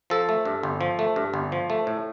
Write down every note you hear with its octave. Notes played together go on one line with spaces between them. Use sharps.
F3 A4
A3
G2
G1
F3
A3
G2
G1
F3
A3
A2